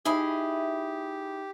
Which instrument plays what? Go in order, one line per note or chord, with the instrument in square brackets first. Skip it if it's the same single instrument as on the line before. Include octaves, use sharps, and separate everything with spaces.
[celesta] D#4 B5 [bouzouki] E4 G#4 D#5 [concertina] G4